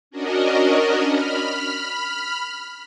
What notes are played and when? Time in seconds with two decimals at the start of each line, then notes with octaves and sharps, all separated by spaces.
0.11 C#4 D4 F#4 A#4 D#5
1.05 B5 F6